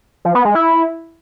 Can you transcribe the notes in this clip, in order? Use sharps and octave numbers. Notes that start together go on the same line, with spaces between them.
F3
B3
G#3
E4